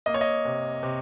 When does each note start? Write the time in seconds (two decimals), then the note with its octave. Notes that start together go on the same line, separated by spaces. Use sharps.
0.06 A#3 D#5
0.14 C#5
0.21 D#5
0.45 C3
0.83 C3